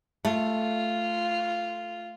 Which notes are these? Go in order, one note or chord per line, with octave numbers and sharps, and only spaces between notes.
A3 F4